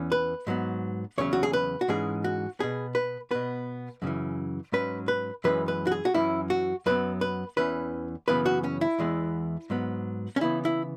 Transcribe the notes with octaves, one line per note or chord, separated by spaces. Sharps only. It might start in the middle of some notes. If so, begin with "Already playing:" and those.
Already playing: E2 E3 C#4
B4
G#2 F#3 B3
E2 C#3 F#3 C#4 C#5
F#4
G#4
B4
F#4
G#2 E3 G#3 C#4 G#4
F#4
B2 B3 G#4
B4
B2 B3 B4
F#2 C#3 E3
G#2 F#3 C#4 B4
B4
F#2 E3 G#3 C#4 B4
B4
F#4
G#4
F#4
F#2 E3 C#4 E4
F#4
F#2 F#3 B3 B4
B4
E2 E3 C#4 B4
F#2 C#3 E3 B3 B4
F#4
C#4
E4
E2 E3 G#3 B3
G#2 F#3 B3
C#4
C#3 E3 B3 E4
E4